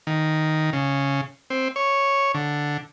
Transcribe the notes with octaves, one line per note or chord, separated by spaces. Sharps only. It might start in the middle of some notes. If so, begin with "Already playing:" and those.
D#3
C#3
C4
C#5
D3